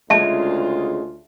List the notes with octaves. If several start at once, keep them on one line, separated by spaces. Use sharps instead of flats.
D2 C#3 G#3 F4 E5 A5